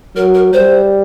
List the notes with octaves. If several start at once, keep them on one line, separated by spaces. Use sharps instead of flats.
F#3 A#4
A#4
G3 C5